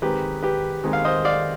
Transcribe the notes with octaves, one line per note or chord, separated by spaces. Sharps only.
D#3 G#3 C4 D#4 G4 B4
G4 B4
D#3 G#3 C4 D#4
F5
C5 D#5
D5 F5